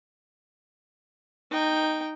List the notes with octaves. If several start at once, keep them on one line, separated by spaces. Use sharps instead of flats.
D#4 G5